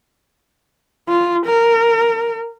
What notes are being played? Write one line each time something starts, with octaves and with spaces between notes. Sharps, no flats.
F4
A#4